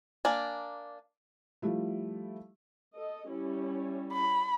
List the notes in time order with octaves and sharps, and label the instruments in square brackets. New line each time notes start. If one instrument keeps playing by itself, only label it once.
[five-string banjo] A#3 D4 D5 G#5
[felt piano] F3 G3 A3 E4
[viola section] A4 D#5
G3 C#4 E4
[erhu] B5